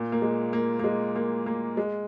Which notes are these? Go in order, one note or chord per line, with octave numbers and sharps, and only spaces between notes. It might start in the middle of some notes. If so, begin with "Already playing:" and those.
Already playing: A#2
A#3
G#3
A#3
A#3
G#3
A#3
A#3
G#3